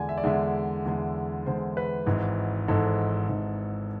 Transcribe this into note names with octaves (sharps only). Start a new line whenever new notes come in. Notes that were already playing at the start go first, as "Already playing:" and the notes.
Already playing: E2 D3 G#3 D5 G#5
E5
D5
E2 D3 G#3 E5
E2 D3 G#3
E2 D3 G#3 C5
B4
G#1 G#2 E3
G#1 G#2 E3 A4
G#1 G#2 E3